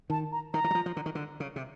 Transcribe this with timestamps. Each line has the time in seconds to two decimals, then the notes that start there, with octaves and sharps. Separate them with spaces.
0.10 D#3 A5
0.32 A#5
0.53 D#3 A#5
0.64 E3
0.71 F#3
0.75 F3
0.86 F3
0.97 D3
1.06 D#3
1.15 D3
1.40 C#3
1.56 C3